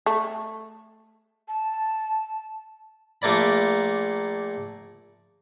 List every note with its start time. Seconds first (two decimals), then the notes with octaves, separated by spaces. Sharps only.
0.06 A3
1.48 A5
3.22 A#1 A3 A#3 D5 B5